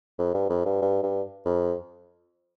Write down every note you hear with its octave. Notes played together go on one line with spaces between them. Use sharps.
F2
G2
F2
G2
G2
G2
F2